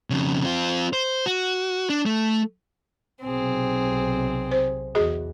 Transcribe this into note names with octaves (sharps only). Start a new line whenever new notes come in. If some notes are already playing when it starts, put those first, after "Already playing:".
F2 C#3
C4 F4
C5
F#4
D4
A3
B1 C3 C4 G#4
C5
E2 F#4 G#4 D#5